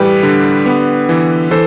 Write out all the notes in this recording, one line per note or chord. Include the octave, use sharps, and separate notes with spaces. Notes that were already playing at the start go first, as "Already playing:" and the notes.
Already playing: A2 E3 G3 G4 B4
D3
B3
E3
E3 A4 C5